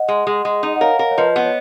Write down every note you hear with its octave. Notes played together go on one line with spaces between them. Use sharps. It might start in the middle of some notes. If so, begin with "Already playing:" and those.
Already playing: D#5 F#5
G#3
G#3
G#3
D#4
F#5
A#4 C#5 F5
A#4
C#5
F3 B4 D#5
B3
C#5